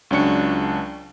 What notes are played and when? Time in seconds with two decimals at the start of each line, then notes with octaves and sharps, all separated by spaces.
0.11 C#2 F#3 C#4 D4 C#6 C#7